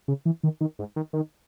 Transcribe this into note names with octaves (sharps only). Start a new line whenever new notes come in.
C#3
E3
D#3
D#3
G#2
D#3
D#3